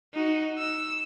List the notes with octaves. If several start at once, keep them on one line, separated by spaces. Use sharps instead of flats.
D#4 F#4
E6